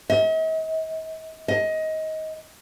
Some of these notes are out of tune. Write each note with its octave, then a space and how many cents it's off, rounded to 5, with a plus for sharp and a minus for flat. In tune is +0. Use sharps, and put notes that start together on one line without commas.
D#5 +45
D#5 +20